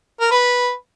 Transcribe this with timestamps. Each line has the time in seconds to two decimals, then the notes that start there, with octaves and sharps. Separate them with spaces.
0.20 A#4
0.31 B4